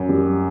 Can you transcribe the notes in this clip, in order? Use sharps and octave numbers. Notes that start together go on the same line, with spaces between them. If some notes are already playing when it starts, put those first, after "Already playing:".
Already playing: F#2
G3